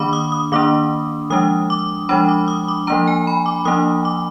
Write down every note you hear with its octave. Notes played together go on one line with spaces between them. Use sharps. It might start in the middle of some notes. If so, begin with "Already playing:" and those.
Already playing: D#3 A#3 D4 B5 D6
D#6
D#6
D#3 A#3 D4 D6
F3 G#3 D4 D#6
D6
F3 G#3 D4 B5
D6
D#6
D6
F3 A#3 D4 A#5
G#5
B5
D6
F3 A#3 D4 D#6
D6